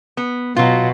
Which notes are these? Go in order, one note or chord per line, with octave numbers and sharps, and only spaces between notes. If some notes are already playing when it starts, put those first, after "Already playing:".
B3
B2 F#3 F4